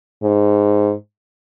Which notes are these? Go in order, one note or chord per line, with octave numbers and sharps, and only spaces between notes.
G#2